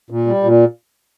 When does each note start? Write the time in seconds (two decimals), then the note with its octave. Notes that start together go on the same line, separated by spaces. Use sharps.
0.10 A#2
0.27 G3
0.43 A#2